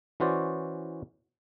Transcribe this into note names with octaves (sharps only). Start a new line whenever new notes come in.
E3 C#4 F#4 C5 D5